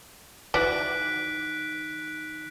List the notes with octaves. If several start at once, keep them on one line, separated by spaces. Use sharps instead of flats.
D#3 E3 F#4 D5 F#6 B6 D7